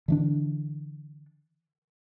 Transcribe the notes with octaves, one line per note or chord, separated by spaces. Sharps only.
D3 E3 D4